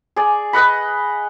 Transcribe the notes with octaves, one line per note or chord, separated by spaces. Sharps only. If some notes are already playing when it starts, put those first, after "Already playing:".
G#4 D5
B4 D#5 F#5 B5